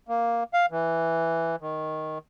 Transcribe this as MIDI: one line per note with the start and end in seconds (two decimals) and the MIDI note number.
0.08 0.43 58
0.54 0.66 77
0.71 1.56 52
1.61 2.18 51